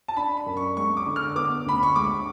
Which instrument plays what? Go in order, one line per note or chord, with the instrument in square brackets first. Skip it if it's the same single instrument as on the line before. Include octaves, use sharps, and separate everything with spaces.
[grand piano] A5
[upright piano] D4 [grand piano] B5
[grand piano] B5
[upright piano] F#2
[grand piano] C#6
[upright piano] G#3 [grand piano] C#6
[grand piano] D6
[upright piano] D3
[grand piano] F6
[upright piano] B3 [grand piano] D6
[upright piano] D2 [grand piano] B5
[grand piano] C#6
[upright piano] G#3 [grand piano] D6